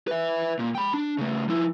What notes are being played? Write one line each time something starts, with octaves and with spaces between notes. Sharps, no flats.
B4 E5
A#2
G5 B5
D4
C#3 A3
F3 E4